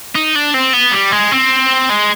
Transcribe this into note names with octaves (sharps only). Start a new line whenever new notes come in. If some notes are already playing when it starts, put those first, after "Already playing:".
D#4
D4
C4
B3
G3
G#3
C4
G#3